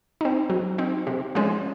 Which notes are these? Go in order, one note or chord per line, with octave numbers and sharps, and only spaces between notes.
C4 D#4
F#3
C4 D#4
C3
F3 G#3 C#4 F4